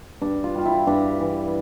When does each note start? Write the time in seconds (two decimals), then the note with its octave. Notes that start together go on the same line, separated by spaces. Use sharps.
0.22 G2 D4
0.44 F4
0.55 G3 F4
0.66 E4
0.87 G2 D4
1.19 E3